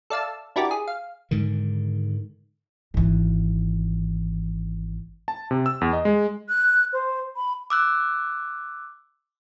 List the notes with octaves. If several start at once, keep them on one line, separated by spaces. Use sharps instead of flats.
A4 D5 E5 F5 A5 E6
D4 E4 F#4 G4 A#4 D5
G#4
F5
G#2 D3 D#3
G#1 E3
A5
C3
E6
E2
D#5
G#3
F#6
C5
B5
D6 E6 F#6